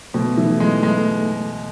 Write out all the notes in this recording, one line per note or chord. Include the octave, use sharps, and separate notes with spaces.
B2 A3
E3
G#3
G#3